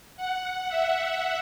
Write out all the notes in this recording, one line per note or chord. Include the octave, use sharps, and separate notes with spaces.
F#5
E5